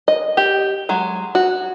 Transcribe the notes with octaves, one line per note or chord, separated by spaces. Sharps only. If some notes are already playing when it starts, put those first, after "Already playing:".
D#5
G4
F#3 G#3
F#4